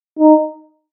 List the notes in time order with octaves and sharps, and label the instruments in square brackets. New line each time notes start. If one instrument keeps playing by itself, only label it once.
[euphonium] D#4